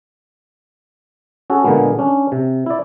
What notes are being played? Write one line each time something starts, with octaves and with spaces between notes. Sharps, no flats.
C#4 F#4 G#4 A4
A#2 D3 G#3 A#3 B3
C#4 D4
C3
E4 D5